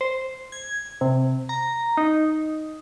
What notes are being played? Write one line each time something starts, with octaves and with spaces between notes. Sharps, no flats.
C5
G#6
C3
A#5
D#4